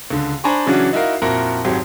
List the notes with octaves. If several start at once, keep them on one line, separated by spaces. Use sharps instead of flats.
C#2 D3
D4 C5 G#5 A#5 B5 C#6
C#3 E3 F#3 C#4 D4 F#4
D#4 E4 F#4 A#4 F5
F2 A#2 E4 F#4 A#4 A#5
G#1 F2 G#2 F#3 G4